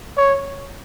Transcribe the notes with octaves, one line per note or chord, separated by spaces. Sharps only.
C#5